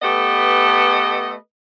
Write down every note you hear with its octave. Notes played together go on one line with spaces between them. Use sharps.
A3 B3 G4 A4 B4 D#5